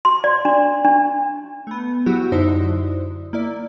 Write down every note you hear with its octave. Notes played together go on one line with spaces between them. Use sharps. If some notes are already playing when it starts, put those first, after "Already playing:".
C6
D5
D4
D4
A3 B3
F#3 E4 F#4 G4
F#2 D3 D#4 E4 C5
A#3 E4 D5